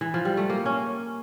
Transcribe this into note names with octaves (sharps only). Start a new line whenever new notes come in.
E3
F3
G3
A3
A#3
C#4